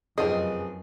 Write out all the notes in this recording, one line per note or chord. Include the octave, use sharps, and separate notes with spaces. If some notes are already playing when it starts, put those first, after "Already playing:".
F1 F#2 F3 C4 D#4 G#4 D#5